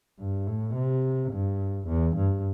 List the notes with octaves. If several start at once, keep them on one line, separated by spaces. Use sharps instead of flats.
G2
A2
C3
G2
E2
G2